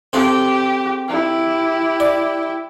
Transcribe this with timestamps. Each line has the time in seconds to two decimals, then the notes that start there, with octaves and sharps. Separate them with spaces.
0.13 C4 G4 A4
1.08 E4 G4
2.00 D5